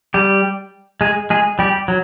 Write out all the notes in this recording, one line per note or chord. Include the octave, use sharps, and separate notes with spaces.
G3 G4
G#3 G#4
G#3 G#4
G3 G4
F#3